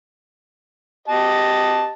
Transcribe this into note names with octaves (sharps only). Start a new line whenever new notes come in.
G4 D#5 A5